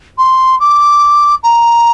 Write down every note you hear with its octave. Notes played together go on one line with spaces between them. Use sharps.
C6
D6
A#5